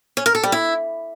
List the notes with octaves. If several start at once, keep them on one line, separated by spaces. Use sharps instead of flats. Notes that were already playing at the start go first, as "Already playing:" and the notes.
C#4
A#4
A4
G3
E4